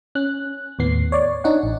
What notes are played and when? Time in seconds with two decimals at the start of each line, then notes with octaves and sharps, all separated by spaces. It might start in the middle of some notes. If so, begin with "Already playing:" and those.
0.15 C#4 F#6
0.79 D#2 A2 B3 C7
1.12 C#5 D5
1.44 D4 D#4 C#5 F#5
1.63 A1